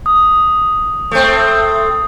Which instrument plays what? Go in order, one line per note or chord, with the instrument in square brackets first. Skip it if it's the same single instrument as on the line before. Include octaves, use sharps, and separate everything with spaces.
[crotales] D#6
[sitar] A3 C4